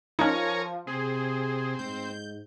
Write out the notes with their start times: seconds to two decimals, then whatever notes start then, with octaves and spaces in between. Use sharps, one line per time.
0.19 F3 C#4 D#4 A#4 C#5 G#5
0.87 C3 C4 G#4
1.79 G#2 G6